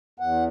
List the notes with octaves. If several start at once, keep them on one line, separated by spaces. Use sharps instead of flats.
E2 F#5